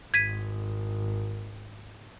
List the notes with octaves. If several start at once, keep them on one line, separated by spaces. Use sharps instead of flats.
G#1 G#6 B6 D#7